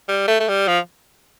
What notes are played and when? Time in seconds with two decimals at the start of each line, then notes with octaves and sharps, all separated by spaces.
0.09 G3
0.28 A3
0.40 A3
0.49 G3
0.68 F3